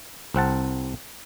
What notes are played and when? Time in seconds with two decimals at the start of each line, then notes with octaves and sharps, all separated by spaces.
0.34 C2 C4 F#5 A5